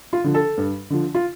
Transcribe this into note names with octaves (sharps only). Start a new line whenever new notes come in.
F4
D3 F3
A4
G2
D3 F3
F4